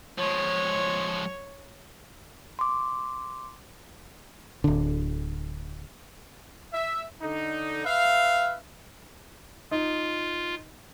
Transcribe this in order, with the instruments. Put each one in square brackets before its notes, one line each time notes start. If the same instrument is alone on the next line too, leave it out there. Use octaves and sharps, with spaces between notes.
[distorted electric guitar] F3 G#3 [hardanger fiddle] C#5
[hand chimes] C6 D6
[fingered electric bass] D1 D3
[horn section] E5
D3 D#4
B4 E5 F5
[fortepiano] D#4 [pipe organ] F4